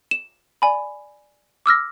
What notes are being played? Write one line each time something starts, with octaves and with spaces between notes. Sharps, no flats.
E7
D5 G#5 B5
D6 E6 F6 A#6